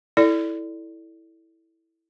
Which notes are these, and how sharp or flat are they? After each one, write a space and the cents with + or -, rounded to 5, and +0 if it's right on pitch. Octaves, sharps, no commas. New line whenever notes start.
E4 -5 A4 +0 D5 +0